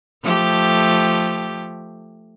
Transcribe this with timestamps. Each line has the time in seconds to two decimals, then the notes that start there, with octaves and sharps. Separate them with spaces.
0.23 F3 A3 G4